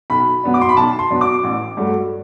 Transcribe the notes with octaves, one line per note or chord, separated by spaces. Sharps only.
B1 B5
B2 F#3 B3 D4
D6
C6
B5
B1 A5
C6
B2 F#3 B3 D4
D6
A1
G2 F#3 A3